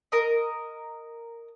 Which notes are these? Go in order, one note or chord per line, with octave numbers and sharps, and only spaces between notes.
A#4 D#5